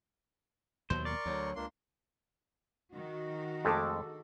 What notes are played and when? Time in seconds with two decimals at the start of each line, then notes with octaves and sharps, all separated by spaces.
0.90 D#2 B2 F#3 C5
1.05 A#4 D5 C6 C#6
1.26 D2 F#3
1.56 C#2 A#3 D4 C6
2.93 D#3 F#4
3.65 F2 G#3 A3 G#4 A4 D6